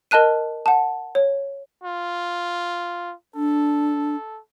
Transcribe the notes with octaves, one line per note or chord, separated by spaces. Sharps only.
A#4 D#5 A5 F#6 D#7
F#5 A5
C#5
F4
D4 A4